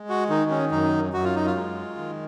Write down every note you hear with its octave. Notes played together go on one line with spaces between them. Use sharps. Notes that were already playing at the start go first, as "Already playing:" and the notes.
Already playing: G#3
F#4
D#3 D#4
C#4
F#2 D#4
F#2 F#4
F4
D#4
F4
G#3
D#3